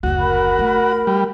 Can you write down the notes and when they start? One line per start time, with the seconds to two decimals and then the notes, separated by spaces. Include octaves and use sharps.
0.03 F#1 D2 F#4
0.19 A#4 B5
0.59 A3
1.07 G3